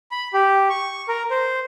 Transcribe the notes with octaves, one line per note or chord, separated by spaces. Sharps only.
B5
G4
C#6
A#4
C5